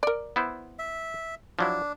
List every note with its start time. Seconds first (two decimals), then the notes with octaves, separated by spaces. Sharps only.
0.03 A#4 D5
0.36 B3 E4 C5
0.79 E5
1.59 F3 F#3 D4 E4